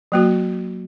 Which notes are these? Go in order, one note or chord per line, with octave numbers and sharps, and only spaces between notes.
F#3 A#3 F#4